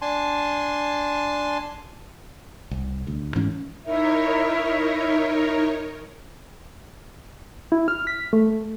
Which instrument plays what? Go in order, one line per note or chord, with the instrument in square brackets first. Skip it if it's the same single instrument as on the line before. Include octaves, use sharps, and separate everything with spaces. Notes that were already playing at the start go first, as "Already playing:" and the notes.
[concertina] D4 G#5 A5 C6
[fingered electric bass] C2
D2
G#2 E3 C#4
[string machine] D#4 A#4 C#5 [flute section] E4 E5
[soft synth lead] E4
F6
B6
A3